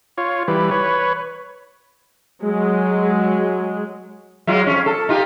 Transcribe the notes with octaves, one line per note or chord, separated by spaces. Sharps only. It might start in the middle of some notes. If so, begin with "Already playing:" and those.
F4 C#5
E3 G3 B4
B4 C#5
F#3 G#3
F#3 G#3 F4
F2 C#4
A4
D#4 F4 G4